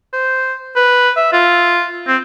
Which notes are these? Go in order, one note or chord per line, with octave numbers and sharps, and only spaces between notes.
C5
B4
E5
F4
C4